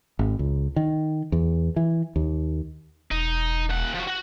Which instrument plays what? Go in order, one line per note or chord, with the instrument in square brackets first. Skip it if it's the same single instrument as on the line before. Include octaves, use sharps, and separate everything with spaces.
[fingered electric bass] G#1
C#2
D#3
E2
E3
D#2
[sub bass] E1 [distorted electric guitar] D#4
[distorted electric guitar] D#2 F#5
F3 F#4
F#4 F#5